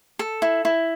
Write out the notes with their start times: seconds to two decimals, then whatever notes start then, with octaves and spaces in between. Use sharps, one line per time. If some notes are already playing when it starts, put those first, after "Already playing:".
0.19 A4
0.42 E4
0.65 E4